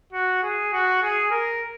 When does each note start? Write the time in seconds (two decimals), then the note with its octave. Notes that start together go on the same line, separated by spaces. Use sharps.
0.13 F#4
0.42 G#4
0.73 F#4
1.02 G#4
1.31 A#4